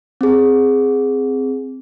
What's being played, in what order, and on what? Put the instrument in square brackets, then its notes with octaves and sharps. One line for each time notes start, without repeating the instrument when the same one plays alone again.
[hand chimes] C4 G#4